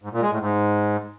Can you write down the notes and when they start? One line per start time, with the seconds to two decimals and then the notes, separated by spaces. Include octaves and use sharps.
0.03 G#2
0.13 A#2
0.22 G#3
0.31 A2
0.40 G#2